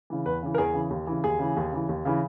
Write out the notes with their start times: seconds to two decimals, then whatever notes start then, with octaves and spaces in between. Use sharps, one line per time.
0.10 C#3 E3
0.26 E2 B4
0.43 C#3 E3
0.54 A#4
0.58 E2 G#4
0.74 C#3 E3
0.90 D#2
1.07 C#3 E3
1.24 D#2 G#4
1.39 C#3 E3
1.57 D#2
1.72 C#3 E3
1.89 D#2
2.05 C#3 E3